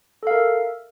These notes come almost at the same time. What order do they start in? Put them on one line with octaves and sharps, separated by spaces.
A4 F5 A#4 E5